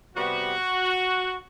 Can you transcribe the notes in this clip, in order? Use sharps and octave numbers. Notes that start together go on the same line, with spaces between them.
C3 G3 B3 F#4